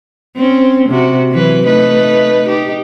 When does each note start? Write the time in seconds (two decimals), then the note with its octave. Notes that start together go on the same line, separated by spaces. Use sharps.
0.36 C4 C#4
0.89 C3 F#4
1.31 E3 F#3 B4
1.66 A3 D#4 B4
2.46 D#4 G4